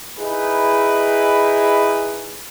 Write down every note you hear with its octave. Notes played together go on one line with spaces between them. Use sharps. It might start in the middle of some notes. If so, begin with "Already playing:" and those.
D#4 E4 G#4 B4